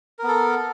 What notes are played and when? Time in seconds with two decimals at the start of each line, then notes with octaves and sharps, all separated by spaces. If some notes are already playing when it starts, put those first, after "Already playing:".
0.19 A#4
0.23 B3
0.28 A4